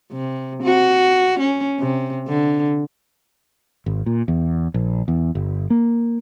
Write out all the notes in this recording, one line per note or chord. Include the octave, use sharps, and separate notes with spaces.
C3
F#4
C#4
C3
D3
G#1
A#2
E2
A#1
E2
G1
A#3